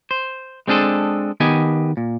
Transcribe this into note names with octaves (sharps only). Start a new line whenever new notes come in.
C5
G#3 C4 D4 G#4 A4
D#3 B3 G4 D#5 G#5
A#2